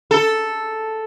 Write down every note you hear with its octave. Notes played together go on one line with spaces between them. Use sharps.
A4